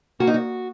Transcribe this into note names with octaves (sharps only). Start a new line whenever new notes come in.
A#3 F#4
D#4
F#4